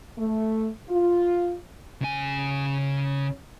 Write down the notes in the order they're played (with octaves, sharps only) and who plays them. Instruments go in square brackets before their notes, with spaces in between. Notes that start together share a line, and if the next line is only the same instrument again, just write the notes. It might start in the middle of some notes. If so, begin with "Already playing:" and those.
[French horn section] A3
F4
[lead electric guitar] C#3 G#5